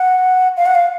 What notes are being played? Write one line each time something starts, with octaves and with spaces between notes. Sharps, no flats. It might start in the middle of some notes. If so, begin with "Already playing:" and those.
Already playing: F#5
F5
F#5
F5